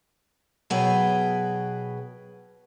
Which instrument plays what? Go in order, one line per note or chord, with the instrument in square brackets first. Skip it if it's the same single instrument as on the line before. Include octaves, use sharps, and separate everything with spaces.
[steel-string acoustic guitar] B2 F#3 G#4 B4 G5